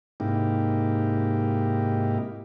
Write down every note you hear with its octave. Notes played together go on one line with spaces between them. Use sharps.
G#2 C3 A#3 D#4 E4 G4